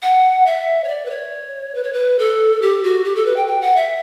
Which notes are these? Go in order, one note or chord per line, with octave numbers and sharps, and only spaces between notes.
F#5
E5
C#5
D5
B4
C#5
B4
C#5
B4
A4
G4
F#4
G4
A4
B4
G5
G5
F#5
E5